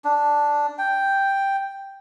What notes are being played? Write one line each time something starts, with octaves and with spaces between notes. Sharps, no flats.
D4
G5